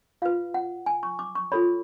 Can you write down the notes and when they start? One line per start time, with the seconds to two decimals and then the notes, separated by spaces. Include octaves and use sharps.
0.22 F4 B4 F5
0.54 F#5
0.86 G#5
1.03 C#6
1.19 D6
1.35 C#6
1.52 F4 A4 C#5 B5